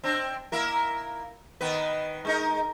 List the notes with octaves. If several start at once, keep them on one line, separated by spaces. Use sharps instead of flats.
C4 D4
A#3 E4 A#4
D#3 B3 B4
G#3 D#4 A#4